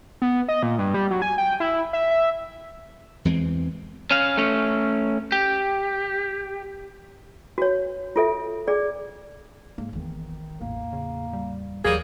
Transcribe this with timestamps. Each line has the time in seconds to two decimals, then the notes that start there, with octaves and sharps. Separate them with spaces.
0.22 B3
0.48 D#5
0.63 A#2
0.78 G2
0.94 G3
1.11 F#3
1.22 G#5
1.38 G5
1.60 E4
1.93 E5
2.11 E5
3.25 E2 E3 G#3 C4
4.11 C#4 F5
4.37 A3 C#4
5.32 G4
7.58 F#4 C#5
8.16 F4 A4 E5
8.68 G#4 D5
9.78 G#2 G#3 A#3
9.93 G#1 E2 D#3 E3
10.61 A1 E2 A2 A#3
10.93 C#3
11.33 G3
11.85 D#2 E3 F#3 G3 A#3 G#4